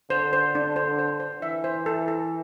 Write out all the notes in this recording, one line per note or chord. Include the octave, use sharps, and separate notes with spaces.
D3 C5
C5
D4
C5
C5
C5
E3 E5
C5
A4
A4